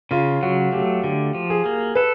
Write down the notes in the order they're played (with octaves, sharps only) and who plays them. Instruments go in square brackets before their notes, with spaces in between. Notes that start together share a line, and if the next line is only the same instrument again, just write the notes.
[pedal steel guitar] C#3 [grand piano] F4
[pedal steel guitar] F#3 [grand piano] F#4
[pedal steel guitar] A3 [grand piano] G4
[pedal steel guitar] D3 [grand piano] G4
[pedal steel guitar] F3
[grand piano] G#4
[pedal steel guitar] A#3
[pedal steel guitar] A4 [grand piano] B4